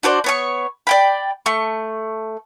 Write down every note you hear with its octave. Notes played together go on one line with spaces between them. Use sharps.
D4 F#4 C5 D5
B3 C#5 C#6
D5 G5 B5
A3 C#6